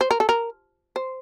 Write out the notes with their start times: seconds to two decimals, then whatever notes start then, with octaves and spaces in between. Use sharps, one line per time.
0.01 C5
0.11 A#4
0.20 A4
0.29 A#4
0.96 C5